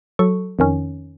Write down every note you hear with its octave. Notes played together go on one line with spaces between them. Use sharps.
F#3 A4 C#6
F2 D#3 C#4